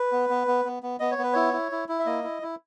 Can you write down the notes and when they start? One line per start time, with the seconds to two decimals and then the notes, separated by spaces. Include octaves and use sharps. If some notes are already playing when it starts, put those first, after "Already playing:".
Already playing: B4
0.12 B3
0.29 B3
0.47 B3
0.65 B3
0.83 B3
1.00 B3 D#5
1.11 C#5
1.18 B3 B4
1.33 E4 C#5
1.53 E4
1.72 E4
1.89 E4
1.99 E5
2.06 A#3 D#5
2.24 E4
2.42 E4